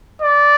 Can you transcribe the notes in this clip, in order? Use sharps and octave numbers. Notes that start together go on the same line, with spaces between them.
D5